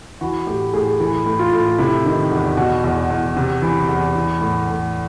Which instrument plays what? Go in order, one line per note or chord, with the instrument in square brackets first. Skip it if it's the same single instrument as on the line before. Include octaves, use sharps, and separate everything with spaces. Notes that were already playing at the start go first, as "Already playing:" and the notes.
[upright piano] E3 F#4
A2 G4
A2 G#4
E3
A2
F4
A2
C3 E4
D#3
E2
B2 F#4
E2
E2
C3
E3
E2
E3
A2
A2